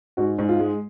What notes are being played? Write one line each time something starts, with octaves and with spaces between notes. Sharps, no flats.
G#2 F#4
G#2
F4
G#3